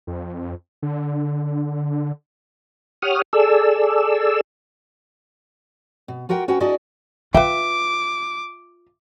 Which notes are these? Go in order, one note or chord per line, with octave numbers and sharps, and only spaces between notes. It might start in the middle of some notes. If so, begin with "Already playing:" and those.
F2
D3
G4 C#5 F#5 D#6 F6
G#4 A4 D5 E6
B2
F4 F#4 A#4 F#5 G5
C#4 F#4 B4 F#5 G5
D4 E4 F#4 G#4 D5 D#5
F4 B4 E5 F5 G5 D6